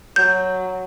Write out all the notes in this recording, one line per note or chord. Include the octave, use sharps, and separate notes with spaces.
F#3 G6